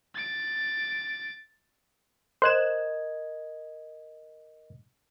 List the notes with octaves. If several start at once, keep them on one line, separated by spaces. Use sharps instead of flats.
A6 D7
A#4 C5 D#5 F#6 G#6 E7